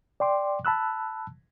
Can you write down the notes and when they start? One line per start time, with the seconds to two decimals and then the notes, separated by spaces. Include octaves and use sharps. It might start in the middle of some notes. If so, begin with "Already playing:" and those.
0.20 D5 G5 C6 D6
0.65 A5 B5 E6 F#6